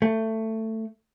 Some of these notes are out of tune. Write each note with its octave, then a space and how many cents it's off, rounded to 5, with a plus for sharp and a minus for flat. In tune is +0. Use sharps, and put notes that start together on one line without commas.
A3 +15